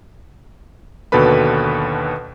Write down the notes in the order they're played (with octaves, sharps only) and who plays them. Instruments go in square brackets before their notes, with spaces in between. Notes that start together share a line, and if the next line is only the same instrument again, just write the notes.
[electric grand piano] D#2 B2 D3 A4 B4 B5